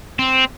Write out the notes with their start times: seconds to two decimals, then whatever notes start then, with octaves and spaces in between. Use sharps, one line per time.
0.19 C4